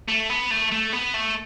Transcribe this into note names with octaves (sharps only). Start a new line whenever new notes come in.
A3
B3
A3
A3
B3
A3